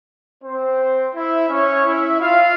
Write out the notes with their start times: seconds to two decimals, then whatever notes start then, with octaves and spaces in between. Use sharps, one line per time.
0.42 C4 C5
1.14 E4 E5
1.49 C#4 C#5
1.85 E4 E5
2.20 F4 F5